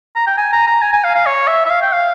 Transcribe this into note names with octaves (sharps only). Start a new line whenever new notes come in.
A#5
G5
G#5
A#5
A#5
G#5
G#5
F5
F5
C#5
E5
E5
F5
G5
F5